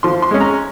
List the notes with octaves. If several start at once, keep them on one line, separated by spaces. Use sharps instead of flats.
F3 C6
C6
G#3 C#4
A#5